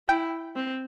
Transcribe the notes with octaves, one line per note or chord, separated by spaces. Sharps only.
E4 G5
C4